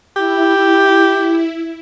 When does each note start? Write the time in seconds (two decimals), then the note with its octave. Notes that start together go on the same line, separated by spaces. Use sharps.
0.16 E4 G4